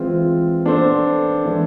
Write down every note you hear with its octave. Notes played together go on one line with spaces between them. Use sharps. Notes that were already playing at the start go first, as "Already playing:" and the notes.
Already playing: E3 G#3 C4 F4
B3 D4 A4 C5
E3 G#3 D4